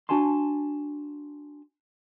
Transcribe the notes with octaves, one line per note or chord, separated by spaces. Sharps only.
D4 F#4 G#5 A5 C6